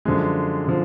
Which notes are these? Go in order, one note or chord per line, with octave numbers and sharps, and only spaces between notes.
F#2 D3 F3 G#3
D3 F3